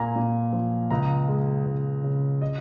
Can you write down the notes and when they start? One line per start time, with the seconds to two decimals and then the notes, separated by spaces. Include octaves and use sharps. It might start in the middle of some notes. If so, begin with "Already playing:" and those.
Already playing: A#2 A#3 G#5 A#5
0.16 A#2
0.53 F3
0.90 C#2 A#5
1.28 G#3
1.66 C#2
2.04 C#3
2.42 D#5